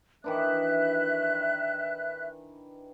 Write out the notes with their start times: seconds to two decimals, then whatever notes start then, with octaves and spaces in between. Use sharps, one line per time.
0.24 D#3 E3 D4 E5 F#6